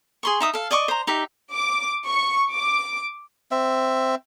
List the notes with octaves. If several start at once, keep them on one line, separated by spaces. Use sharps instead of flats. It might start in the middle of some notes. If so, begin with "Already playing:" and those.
G#4 C6 C#6
D#4 E5 D#6
A4 F5
D5 D#5 C#6 D6
C5 A#5
D#4 G4 E5
D6
C#6
D6
C4 E5